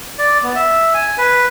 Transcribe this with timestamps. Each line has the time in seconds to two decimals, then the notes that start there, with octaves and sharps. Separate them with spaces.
0.19 D5
0.43 B3
0.56 E5
0.94 G#5
1.18 B4